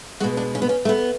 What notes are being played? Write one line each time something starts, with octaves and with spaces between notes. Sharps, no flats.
B2 G#3 F#4
D4
C#4
B3
C#4
A3
B3